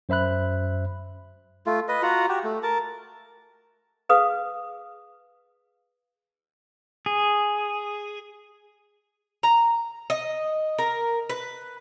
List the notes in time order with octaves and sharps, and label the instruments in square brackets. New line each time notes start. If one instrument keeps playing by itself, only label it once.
[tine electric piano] F#2 C5 E5 B5 F#6
[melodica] A3 F4
B4 D#5
F4 F#4 F#5 A#5
F#4 G4
A3
A#4 A5
[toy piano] G#4 B4 F5 D#6
[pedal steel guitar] G#4
[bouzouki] A#5
D#5
A#4
B4